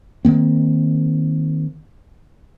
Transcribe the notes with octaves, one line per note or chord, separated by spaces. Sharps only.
D#3 F3 A#3 C4